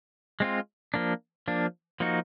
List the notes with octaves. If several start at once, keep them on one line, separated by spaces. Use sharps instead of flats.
G#3 C4 F4
F3 A#3 D4
F3 A#3 D4
F3 A#3 D#4 F#4